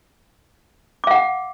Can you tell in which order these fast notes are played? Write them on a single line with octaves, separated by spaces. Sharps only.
D6 F5 F#5